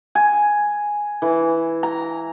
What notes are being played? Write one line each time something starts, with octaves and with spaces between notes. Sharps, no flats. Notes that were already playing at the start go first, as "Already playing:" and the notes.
G#5
E3
A#5